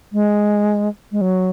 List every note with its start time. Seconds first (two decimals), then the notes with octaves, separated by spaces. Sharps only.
0.13 G#3
1.12 G#3
1.21 F#3